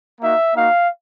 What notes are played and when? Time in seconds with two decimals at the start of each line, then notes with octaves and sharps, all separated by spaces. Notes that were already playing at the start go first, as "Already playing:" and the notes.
0.21 A#3 D#4 F#4 E5
0.56 A#3 D#4 F#4 F5